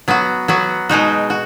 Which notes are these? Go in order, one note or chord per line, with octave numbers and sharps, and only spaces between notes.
F#3 B3 F#4
F#3 B3 F#4
B2 G#3 D#4 F#4
F#4